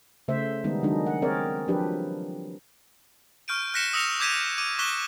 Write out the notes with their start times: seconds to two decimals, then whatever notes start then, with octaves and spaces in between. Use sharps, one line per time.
0.28 C#3 A3 C5 E5
0.64 D#3 G3 G#3 B3 D#4
0.83 D#3 F#3 G#3 D4 D#4
1.06 F#5
1.22 C4 G#4 A#4 C#5 D5
1.68 F3 F#3 D4 G4 B4
3.48 C#6 F6 G6 D7 D#7
3.74 F6 F#6 A#6 B6 C#7 E7
3.93 D#6 E6 A#6 C#7 F7
4.20 D6 G6 G#6 B6 D#7 E7
4.58 D6 D#7
4.79 C#6 D6 F#6 B6 E7 G7